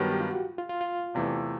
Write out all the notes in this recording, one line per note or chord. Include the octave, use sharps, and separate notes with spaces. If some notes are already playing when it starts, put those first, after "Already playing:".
Already playing: G2 D#3 F#3 B3 G4
G4
F4
F#4
F4
F4
F4
E2 C3 E3 A3